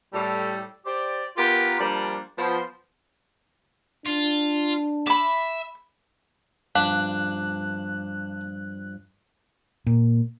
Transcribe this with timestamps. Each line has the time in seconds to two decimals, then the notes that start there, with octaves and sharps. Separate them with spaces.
0.14 A2 G3 A4
0.86 G4 C5 D5
1.37 B3 F4 G4 A#4
1.80 F3 G3 A#3 D4
2.38 F3 B3 C5
4.06 D4 F4
5.07 E5 B5 D6
6.75 G2 F3 D4 F5 F#6
9.87 A#2